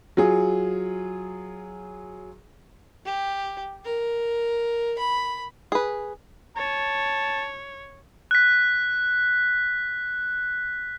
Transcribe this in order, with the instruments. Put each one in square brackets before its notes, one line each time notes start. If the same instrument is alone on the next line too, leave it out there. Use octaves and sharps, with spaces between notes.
[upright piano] F#3 F4 G#4
[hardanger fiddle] G4
A#4
B5
[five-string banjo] G#4 B4
[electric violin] C#5 [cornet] A5
[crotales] F#6 B6